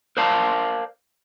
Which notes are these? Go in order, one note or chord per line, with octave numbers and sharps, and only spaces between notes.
A#4 C5 D5 F5 A5